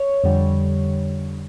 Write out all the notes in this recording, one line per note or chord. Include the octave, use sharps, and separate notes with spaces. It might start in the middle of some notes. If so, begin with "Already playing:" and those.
Already playing: C#5
F2 D3 G3